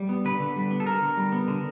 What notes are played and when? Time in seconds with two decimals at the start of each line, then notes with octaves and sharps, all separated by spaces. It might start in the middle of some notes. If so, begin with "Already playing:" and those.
Already playing: G3
0.09 B3
0.25 D3 B4
0.40 D3
0.56 G3
0.71 B3
0.80 A4
0.86 D3 A#4
1.02 D3
1.17 G3
1.32 B3
1.48 D3